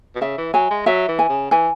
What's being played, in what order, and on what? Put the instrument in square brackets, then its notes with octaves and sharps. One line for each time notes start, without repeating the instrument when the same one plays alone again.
[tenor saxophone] B2
[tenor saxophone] C#3 [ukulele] E5
[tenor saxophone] E3
[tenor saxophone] F#3 [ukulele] G#5
[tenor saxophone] G#3
[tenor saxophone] F#3 [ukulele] E5
[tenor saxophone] E3
[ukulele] G#5
[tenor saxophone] C#3
[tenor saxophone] E3 [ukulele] G#5